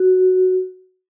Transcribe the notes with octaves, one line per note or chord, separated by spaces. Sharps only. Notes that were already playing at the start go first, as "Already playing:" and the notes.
Already playing: F#4